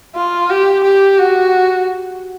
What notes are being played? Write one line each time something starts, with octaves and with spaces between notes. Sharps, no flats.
F4
G4
G4
F#4